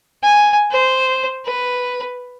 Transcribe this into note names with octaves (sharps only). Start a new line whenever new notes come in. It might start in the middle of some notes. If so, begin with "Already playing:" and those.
G#5
C5
B4